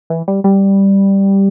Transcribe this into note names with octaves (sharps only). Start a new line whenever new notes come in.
E3
G3
G3